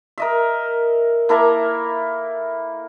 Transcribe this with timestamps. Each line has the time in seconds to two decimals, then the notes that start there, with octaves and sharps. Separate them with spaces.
0.18 A#4 D#5 E5
1.29 A#3 E4 A4 A#5